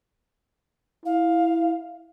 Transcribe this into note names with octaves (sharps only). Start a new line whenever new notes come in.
E4 F5